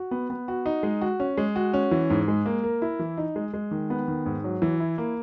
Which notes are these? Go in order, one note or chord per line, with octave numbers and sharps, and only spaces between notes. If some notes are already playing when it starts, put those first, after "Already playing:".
Already playing: F#4
B3
B3
F#4
D#4
G#3
F#4
C#4
G#3
F#4
C#4
E3
G#2
G#3
A#3
A#4
E4
E3
D#4
G#3
G#3
D#3
B3
D#3
G#2
F#3
E3
E4
A#3